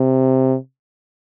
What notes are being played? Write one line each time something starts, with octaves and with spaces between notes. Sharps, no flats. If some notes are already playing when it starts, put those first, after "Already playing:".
Already playing: C3